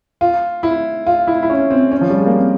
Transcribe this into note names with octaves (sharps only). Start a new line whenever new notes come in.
F4
E4
F4
E4
E4
C#4
C4
C#4
F3
G3
G#3
A#3
C4